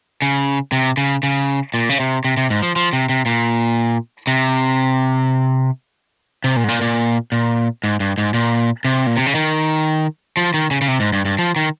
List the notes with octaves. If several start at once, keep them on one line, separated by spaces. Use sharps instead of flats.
C#3
C3
C#3
C#3
A#2
C#3
C3
C3
C3
G#2
F3
F3
C3
C3
A#2
C3
C3
A#2
G#2
A#2
A#2
A#2
G#2
G2
G#2
A#2
C3
A#2
C3
C#3
D#3
F3
D#3
C#3
C#3
C3
G#2
G2
G2
F3
D#3